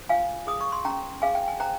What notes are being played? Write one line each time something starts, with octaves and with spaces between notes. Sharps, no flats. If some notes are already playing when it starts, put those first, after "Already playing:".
Already playing: C5
F4 F5 G#5
G#4 D#6
C#6
C6
C#4 G5 A#5
G#4 F5 G#5
G5
G#5
C5 G5 A#5